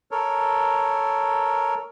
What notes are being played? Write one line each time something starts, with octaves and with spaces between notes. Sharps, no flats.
A4 A#4 C#5